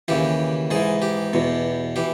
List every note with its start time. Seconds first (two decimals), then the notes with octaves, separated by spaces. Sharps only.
0.08 D#2 C#3 E3 G4
0.71 G#2 E3 G#4
1.02 G4
1.33 E2 B2
1.96 E3 G4